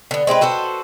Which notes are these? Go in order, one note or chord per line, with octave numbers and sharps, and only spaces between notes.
D3 B3
G#3 C4 G4 B4
F#4 A4 B4 C5